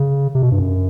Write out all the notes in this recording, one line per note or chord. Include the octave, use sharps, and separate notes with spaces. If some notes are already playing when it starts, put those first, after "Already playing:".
Already playing: C#3
C3
B2
G2
F#2